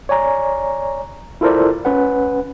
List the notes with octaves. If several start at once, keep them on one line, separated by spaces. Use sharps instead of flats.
C#5 D5 G#5 A#5
E4 F4 A4 A#4 C5 D5
C#4 B4 F#5